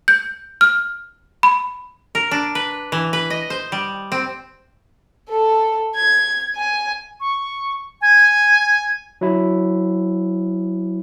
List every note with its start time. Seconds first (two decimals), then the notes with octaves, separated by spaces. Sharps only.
0.08 G6
0.61 F6
1.43 B5
2.15 A#4
2.31 D4
2.55 B4
2.92 E3
3.13 B4
3.30 D#5
3.50 C5
3.72 G3
4.12 C4
5.29 A4
5.95 G#6
6.56 G#5
7.20 C#6
8.01 G#5
9.21 F#3 E4